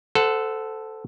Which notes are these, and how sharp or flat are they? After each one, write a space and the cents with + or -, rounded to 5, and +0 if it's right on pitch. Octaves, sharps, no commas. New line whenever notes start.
A4 +0 C5 -25 F#5 +0